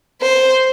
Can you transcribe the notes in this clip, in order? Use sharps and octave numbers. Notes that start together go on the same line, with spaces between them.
C5